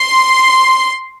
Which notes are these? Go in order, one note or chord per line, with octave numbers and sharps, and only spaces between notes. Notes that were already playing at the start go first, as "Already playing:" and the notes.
Already playing: C6